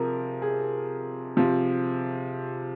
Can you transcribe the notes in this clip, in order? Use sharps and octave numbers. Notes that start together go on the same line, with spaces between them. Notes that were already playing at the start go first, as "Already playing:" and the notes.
Already playing: C3 F3 G#4 A#4
G#4
C3 F3